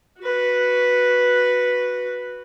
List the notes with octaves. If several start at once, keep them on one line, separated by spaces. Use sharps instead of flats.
F#4 B4